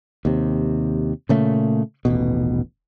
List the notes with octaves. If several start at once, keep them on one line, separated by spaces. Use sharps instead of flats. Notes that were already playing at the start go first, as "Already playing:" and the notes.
D#2 C3
A#2 C#3 A3
D#1 A1 B2